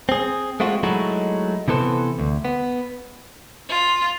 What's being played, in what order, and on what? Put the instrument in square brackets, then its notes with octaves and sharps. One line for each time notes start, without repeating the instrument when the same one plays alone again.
[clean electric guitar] C4 G#4
G#3 A3 C4 F4 F#4
F#3 G#3 A3 D#4 E4 F#4
C3 E3 B3 A4 C5
D2
B3
[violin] F4